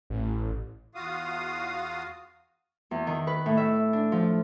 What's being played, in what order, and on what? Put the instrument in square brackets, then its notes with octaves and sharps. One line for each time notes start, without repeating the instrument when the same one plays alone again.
[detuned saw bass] A1
[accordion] E2 F4 F#4 F5 D#6
[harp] E2
D#3
B4
A2
E5
D4
F3